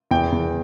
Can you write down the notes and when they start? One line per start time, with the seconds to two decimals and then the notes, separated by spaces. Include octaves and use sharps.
0.11 E2 G5
0.32 E2